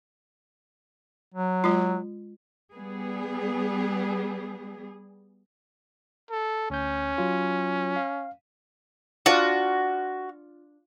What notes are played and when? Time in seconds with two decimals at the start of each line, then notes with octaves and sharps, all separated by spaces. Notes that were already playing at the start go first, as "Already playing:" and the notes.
1.34 F#3
1.64 G#3 F4
2.73 G3 B3 G#4
6.30 A4
6.70 D2 C#4 G6
7.18 F#3 F4
7.96 F5
9.26 D4 F4 F#4